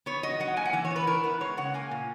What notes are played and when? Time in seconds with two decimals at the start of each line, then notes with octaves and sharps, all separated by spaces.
0.06 B3 C#5
0.23 F#3 D#5
0.40 F#3 F#5
0.57 A#3 G#5
0.65 F#5
0.73 E3 E5
0.85 C#5
0.91 B3
0.96 B4
1.07 E4 A#4
1.24 B3 B4
1.40 G#3 C#5
1.57 C#3 F#5
1.74 A#3 G#5
1.91 A#2